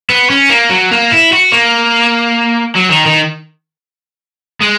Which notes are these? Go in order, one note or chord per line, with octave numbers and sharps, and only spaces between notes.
B3
C#4
A#3
F#3
A#3
E4
F#4
A#3
F#3
D#3
D#3
G#3